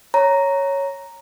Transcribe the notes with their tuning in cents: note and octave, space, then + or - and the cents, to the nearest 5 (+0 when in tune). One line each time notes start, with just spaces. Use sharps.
C#5 +0 A#5 +0